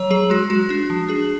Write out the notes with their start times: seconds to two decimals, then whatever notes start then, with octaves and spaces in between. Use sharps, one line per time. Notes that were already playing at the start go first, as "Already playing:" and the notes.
Already playing: F#3 C#5
0.10 F#3 G#4
0.30 G#3 F#4
0.50 G#3 F#4
0.69 D4 F#4
0.90 F3
1.08 D4 G#4